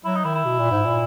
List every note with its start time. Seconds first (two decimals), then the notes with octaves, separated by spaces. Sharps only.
0.05 F#3 E4
0.15 D#4
0.24 D#3 E4
0.35 E4
0.45 B2
0.59 A#2
0.72 G#2
0.86 A#2